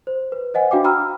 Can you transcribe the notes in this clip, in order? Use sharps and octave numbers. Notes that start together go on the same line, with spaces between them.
C5
B4
C5 D#5 F#5 G#5
D4 F#4 F5 G5 D6
G5 A#5 B5 E6 F6